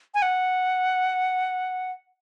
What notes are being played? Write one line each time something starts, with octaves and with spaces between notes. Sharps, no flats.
G#5
F#5